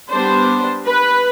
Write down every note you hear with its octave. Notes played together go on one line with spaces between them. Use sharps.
G3 B3 D4 C5
B4